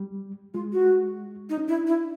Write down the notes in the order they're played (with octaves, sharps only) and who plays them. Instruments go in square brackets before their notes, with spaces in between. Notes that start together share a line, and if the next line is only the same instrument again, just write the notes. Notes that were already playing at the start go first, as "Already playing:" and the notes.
Already playing: [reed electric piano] G3
[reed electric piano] G#3 [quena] F4
[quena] F#4
D#4
[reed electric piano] C#4
[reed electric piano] D4 [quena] E4
[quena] E4